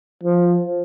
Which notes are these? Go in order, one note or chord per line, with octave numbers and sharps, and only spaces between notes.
F3